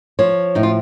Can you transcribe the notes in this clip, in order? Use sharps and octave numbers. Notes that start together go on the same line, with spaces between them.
F3 C#5
A2 D#4
F4